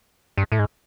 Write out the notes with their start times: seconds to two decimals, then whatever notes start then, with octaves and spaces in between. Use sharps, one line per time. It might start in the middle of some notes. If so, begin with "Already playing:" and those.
0.37 G2
0.52 A2
0.59 G#2